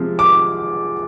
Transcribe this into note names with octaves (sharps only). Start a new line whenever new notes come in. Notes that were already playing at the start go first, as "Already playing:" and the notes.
Already playing: C3 F3 G#3
D6